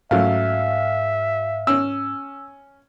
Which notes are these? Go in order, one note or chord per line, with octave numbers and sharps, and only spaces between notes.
G#2 F#3 A3 C#4 E5 F5
C#4 E6